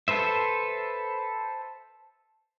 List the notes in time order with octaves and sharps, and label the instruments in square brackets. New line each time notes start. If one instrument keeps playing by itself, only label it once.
[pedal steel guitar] A4 B4 C5 E5